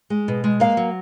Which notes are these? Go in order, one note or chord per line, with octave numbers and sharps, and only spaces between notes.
G#3
B2
G#3
A#3 F5
F#3